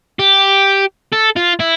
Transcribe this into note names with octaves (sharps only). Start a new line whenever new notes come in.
G4
A4
F4
E4